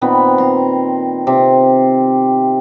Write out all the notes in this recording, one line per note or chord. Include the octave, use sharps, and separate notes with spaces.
A#2 D#3 B3 C4
A#5 C6
C3